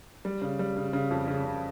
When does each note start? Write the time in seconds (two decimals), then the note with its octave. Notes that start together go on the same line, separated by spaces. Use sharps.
0.25 G3
0.42 C#3
0.59 G3
0.77 C#3
0.93 C#3
1.10 F2
1.28 C#3
1.45 C#3